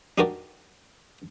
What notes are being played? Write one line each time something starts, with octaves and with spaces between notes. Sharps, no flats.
D4 D#4 F#4 G4 A#4 D5